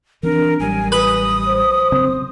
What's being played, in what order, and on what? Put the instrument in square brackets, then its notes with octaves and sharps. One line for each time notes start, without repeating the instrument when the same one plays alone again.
[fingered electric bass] E3 C4 D4 [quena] A#4
[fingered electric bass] A1 F#3 G3 [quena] G#5
[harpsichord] B4 [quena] D#6
[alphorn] C5
[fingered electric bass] C#3 F#3 C4